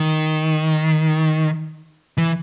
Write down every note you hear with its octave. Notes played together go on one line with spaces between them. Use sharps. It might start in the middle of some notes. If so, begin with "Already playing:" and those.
Already playing: D#3
E3